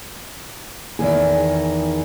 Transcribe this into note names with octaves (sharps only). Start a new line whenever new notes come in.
E2 G2 D#3 G#4